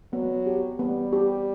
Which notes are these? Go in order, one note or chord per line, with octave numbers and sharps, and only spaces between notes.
F#3 B3
G4
G3 B3
G4